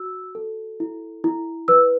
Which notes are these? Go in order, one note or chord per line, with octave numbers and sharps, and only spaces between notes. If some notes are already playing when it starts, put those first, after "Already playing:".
Already playing: F#4 E6
A4
E4
E4
B4 E6